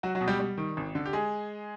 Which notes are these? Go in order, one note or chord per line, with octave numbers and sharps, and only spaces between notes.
F#3 F#4
F#3 F#4
B2
G3 G4
G3
D#3
G#1
D3
G4
G#3 G#4